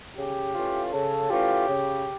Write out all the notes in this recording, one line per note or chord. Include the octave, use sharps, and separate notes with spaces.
C#3 G4
E3 A3 C#4 F4
C#3 A4
E3 A3 C#4 F4 G4
C#3